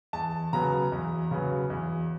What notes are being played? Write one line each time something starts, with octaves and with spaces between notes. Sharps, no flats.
E2 A5
C#3 F#3 B3 A#5
E2
C#3 F#3 B3
E2